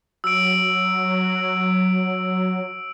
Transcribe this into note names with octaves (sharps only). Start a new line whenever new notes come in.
F#3 E6 D7